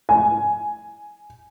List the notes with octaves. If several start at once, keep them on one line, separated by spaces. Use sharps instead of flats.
G#5